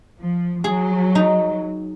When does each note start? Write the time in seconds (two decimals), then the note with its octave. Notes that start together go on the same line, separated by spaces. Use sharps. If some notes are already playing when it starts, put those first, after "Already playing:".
0.21 F3
0.64 F#3 G#4
1.15 D#4